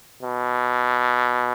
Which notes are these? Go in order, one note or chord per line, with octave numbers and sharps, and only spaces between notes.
B2